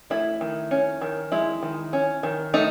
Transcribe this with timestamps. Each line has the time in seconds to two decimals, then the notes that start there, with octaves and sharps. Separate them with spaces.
0.10 A3 E4
0.41 D#3
0.71 C#4
1.01 D#3
1.32 G#3 E4
1.63 D#3
1.93 C#4
2.23 D#3
2.54 A3 D#4